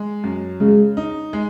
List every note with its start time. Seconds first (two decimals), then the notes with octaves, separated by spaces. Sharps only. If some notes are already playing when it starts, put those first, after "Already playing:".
Already playing: G#3
0.24 F#2
0.60 C#3 G#3
0.97 D#4
1.33 G#3